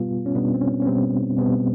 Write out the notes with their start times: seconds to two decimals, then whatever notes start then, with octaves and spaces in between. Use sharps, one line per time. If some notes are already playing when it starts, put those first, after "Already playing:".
Already playing: B2 G3 B3 F4
0.26 C#4
0.35 B2 G3 B3 D4
0.54 C4
0.61 C#4
0.82 C#4
0.86 B2 G3 B3 C4
1.38 B2 G3 B3 C4